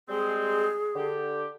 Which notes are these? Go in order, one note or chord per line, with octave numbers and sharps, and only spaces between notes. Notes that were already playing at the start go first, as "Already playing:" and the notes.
G3 G#3 C4 G#4
D3 G4